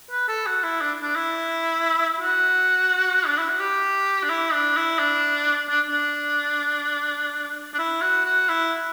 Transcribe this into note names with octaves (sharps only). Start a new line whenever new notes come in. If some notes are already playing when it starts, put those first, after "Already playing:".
B4
A4
F#4
E4
D4
D4
E4
F#4
D4
E4
F#4
G4
D4
E4
D4
E4
D4
D4
D4
D4
E4
F#4
F#4
E4